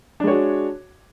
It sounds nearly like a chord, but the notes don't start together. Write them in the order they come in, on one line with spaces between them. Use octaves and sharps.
D4 G#3 C#5 F#4